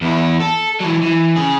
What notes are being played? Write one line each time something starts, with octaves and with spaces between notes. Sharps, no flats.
E2 E4
A4
E3 F#3
E3
C#3 G#4